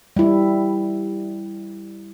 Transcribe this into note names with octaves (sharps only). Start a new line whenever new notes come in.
G3 E4